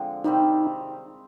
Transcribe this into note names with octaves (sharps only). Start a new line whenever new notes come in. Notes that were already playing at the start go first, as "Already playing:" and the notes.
Already playing: D3 F3 G#3 C4
C3 D#3 G3 C4 D#4